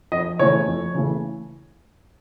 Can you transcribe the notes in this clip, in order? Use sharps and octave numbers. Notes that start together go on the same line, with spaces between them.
F2 D#5
C#3 E3 A3 C#5
F2
C#3 E3 A3